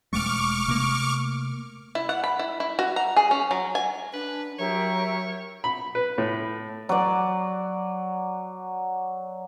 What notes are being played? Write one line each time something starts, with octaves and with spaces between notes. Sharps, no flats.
E1 G#3 A3 C#6 D6 F6
C3 A3 A#3
E4
F#5
B5
E4
E4
F#4
A#5
G#4
C#4
F#3
G#5
D4 B4
F#3 G4 A#4 C#5 E5
B5
B4
A2
F#3 D5